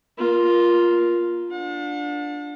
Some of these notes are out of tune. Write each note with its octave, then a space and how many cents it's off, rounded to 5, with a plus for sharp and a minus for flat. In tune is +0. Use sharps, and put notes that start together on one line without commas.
A#3 +20 F4 +0
D4 +0 F#5 -45